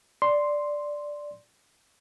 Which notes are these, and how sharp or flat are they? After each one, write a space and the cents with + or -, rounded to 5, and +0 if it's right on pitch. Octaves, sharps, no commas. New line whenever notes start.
D5 +0 C6 +0